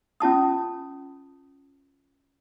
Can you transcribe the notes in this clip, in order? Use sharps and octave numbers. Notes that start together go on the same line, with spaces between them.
C#4 F4 A5 D#6